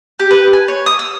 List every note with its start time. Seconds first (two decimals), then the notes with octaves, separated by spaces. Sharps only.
0.19 G4
0.31 B4
0.53 G#5
0.68 C#5
0.86 D#6
0.99 E6